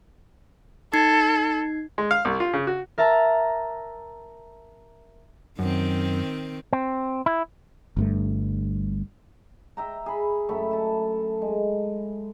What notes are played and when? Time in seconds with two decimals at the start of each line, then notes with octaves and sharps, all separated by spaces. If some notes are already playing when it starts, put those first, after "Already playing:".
0.93 D#4 A4 G#6 C7
1.98 G#3
2.11 F5
2.25 C2
2.40 F4
2.53 C#3
2.67 F#4
2.98 A#4 E5 A5 A#5
5.59 F#2 D#3 C4
6.73 C4
7.26 E4
7.97 G1 G2 A3
9.77 E5 G5 A#5
10.06 G#4 B5
10.49 F#2 A3 G5 B5
10.71 E5 A5
11.42 G#3